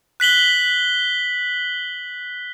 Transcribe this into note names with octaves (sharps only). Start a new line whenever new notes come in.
F#6 B6 F#7 G7